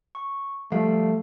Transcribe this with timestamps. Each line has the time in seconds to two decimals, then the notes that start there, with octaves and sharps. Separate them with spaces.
0.15 C#6
0.72 F3 G3 A3 F5